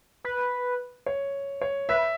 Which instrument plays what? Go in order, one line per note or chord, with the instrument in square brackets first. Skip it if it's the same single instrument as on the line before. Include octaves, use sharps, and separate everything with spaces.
[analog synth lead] B4
[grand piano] C#5
C#5
[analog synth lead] B4 [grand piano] E5